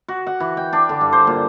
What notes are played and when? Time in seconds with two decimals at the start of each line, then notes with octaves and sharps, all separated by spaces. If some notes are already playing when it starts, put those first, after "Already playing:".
0.08 F#4
0.27 F#5
0.40 E3
0.57 G5
0.73 D4
0.89 D3
1.01 G2
1.13 C5
1.27 A#2